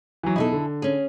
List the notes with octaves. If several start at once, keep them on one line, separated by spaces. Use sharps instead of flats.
E3 F#3
B2 D#4 E4 G#4 A4
D3
C#4 G#4